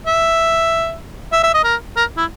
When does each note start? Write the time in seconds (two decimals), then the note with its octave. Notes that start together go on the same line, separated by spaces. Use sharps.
0.06 E5
1.32 E5
1.43 E5
1.54 D#5
1.64 A#4
1.97 A#4
2.17 E4